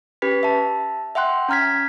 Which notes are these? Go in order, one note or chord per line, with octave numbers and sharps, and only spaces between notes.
C#4 G4 B4 B5 B6
E5 A5
E5 F#5 G5 C6 F#6
C#4 A#5 F6 G#6 B6